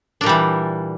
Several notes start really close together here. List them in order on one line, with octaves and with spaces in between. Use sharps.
D4 A#2 G3 E3